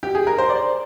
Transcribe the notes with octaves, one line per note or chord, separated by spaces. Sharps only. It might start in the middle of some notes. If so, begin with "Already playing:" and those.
G4
G#4
A#4
C5
D5